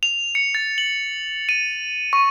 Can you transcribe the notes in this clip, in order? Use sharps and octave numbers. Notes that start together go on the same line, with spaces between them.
F7
C#7
A6
F#7
D#7
C#6